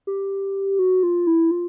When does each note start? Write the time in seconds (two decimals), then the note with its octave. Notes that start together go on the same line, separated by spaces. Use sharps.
0.07 G4
0.79 F#4
1.03 F4
1.27 E4
1.51 F4